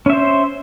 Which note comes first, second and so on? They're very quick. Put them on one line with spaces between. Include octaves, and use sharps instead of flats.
C#4 E5 C5